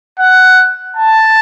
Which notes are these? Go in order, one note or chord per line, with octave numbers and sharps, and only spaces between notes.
F#5
A5